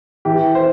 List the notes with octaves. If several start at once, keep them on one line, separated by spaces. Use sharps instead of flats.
E3 G4
C5